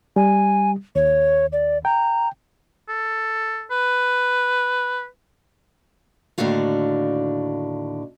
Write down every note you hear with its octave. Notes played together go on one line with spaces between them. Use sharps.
G3 G#5
D#2 C#5
D5
G5 A#5
A4
B4
D#2 A2 D3 D4 F#4 F5